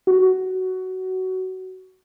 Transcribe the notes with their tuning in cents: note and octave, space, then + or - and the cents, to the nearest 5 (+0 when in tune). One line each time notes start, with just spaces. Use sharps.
F#4 +15